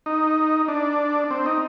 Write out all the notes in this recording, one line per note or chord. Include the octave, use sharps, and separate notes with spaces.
D#4
D4
C4
D#4